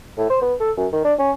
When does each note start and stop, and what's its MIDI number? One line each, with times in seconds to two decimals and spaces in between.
0.17 0.25 45
0.30 0.38 72
0.42 0.54 59
0.60 0.71 69
0.77 0.87 42
0.93 1.04 51
1.05 1.14 62
1.19 1.31 61